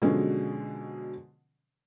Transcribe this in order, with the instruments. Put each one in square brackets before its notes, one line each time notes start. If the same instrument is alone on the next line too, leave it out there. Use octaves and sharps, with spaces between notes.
[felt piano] B2 D3 F3 F#3 G#3 C#4